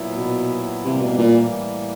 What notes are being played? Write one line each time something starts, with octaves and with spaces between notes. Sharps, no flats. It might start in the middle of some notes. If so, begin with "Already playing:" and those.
Already playing: A#2 F#3 B3 E4
B2
A2 C3 E3 G3 A#3
B2
A#2